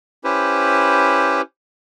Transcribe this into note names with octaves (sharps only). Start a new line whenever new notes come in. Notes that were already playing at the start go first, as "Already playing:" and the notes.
C#4 E4 G4 B4 C5